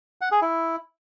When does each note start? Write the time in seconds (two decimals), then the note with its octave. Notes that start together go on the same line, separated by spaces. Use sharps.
0.21 F#5
0.32 G#4
0.42 E4